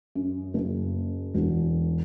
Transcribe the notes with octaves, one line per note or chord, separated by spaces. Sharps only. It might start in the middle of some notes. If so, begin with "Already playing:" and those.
F#2
F#1
E1